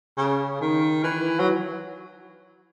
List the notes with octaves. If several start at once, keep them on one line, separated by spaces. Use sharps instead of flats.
C#3
D#3
E3
F#3